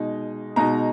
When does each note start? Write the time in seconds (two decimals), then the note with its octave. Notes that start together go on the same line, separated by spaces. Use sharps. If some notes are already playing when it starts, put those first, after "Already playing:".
Already playing: B2 G#3 D#4
0.56 B2 G#3 D#4 A#5